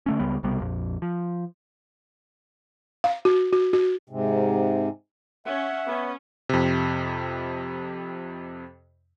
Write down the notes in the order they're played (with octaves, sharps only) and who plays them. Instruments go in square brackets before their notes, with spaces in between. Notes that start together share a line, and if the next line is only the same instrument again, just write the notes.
[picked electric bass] D3 A3 C#4
C#2 C#3 G3 B3
B1 C3 G3 B3
A#1 F2
F3
[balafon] F5
F#4
F#4
F#4
[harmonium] G#2 C3
[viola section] C#4 [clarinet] E5 [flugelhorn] F#5
[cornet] B3 [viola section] C#4
[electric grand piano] F2 C3